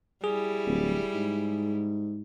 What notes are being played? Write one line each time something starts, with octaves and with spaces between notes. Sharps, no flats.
G3 E4 G#4
D1
G#2